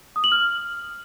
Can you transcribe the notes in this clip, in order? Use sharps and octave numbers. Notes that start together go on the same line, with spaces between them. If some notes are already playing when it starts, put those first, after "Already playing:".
D#6
F#7
F6